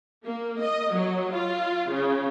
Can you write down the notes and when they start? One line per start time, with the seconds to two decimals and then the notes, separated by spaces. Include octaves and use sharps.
0.24 A#3
0.61 D#5
0.93 F#3
1.32 F4
1.89 C#3